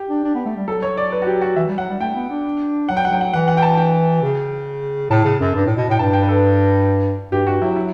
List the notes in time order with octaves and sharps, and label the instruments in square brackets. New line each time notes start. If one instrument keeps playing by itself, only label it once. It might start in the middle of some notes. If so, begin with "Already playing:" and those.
Already playing: [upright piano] G4
[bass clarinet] D4
D4
B3
A3
G3
[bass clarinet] F#3 [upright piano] A4
[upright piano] C#5
D5
B4
F#4
G4
F#4
[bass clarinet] E3 [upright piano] E5
[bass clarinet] G3
[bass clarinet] F#3 [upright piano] F#5
[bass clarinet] G3
[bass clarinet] A3 [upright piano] G5
[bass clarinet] B3
D4
[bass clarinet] F#3 [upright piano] F#5
[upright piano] G5
F#5
[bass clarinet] F#3 [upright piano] G5
[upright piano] F#5
[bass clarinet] E3 [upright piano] F#5
[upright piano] F#5
G5
A5
G5
[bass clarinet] C#3
[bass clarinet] A2 [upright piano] A5
[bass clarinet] C#3
F#2
G2
A2
B2
[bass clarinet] A2 [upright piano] G5
[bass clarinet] G2 [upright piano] A5
[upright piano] G5
B4
A4
[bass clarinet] G2 [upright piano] G4
[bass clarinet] G2 [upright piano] F#4
[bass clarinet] F#3 [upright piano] E4
[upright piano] E4